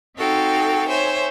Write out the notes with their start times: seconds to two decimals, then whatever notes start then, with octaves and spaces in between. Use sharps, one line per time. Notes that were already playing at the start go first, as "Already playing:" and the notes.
0.15 C4 D#4 F#4 A4 F5 G5
0.88 C5 C#5 E5 G#5